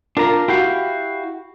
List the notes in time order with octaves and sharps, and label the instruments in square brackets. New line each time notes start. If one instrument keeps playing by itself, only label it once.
[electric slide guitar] D4 A#5 [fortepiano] F4 A#4
[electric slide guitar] E4 G4 F5 [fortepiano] F#4